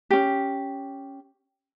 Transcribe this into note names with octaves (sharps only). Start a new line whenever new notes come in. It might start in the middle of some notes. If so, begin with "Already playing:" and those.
C#4 G4